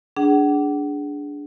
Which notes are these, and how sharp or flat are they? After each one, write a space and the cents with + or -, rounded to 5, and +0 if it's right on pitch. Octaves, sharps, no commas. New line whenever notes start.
D4 -10 G#4 +0 F#5 +30